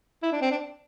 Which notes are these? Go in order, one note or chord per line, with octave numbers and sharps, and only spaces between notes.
E4
D4
C4
D4